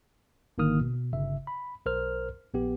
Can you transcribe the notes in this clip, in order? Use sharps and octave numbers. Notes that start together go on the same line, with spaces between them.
G#1 D3 D#3 A#3 D#6 F6
B2
G1 C#3 E5
B5
B1 A#4 C5 F6
A#1 B3 G4